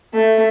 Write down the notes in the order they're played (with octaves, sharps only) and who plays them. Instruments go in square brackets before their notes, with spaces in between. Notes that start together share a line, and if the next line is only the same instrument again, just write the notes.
[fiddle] A3